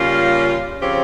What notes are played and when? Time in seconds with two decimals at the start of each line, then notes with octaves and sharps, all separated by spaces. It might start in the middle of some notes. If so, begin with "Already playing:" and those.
Already playing: C#3 G3 A#3 C#4 F4
0.81 C#3 F3 C4 G4 C#5